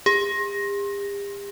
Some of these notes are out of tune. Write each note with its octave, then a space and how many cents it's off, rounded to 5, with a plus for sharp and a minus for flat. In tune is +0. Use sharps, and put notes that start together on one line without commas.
G4 +45